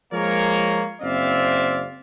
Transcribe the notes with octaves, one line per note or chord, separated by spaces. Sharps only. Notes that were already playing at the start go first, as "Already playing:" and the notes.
F3 G#3 A#3 A#4 C#5
F#1 C4 D5 E5 F5